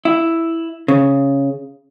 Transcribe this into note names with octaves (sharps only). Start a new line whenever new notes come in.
E4
C#3